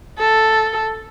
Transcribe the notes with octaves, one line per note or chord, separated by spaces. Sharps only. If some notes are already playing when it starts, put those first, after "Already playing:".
A4